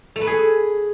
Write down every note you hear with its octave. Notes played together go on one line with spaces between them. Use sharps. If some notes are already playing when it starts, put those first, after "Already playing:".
A3
B4
G#4